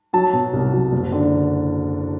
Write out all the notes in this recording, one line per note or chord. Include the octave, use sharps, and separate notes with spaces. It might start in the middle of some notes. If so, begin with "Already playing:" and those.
F#3 A5
B2
C2
F#3
F#1
D3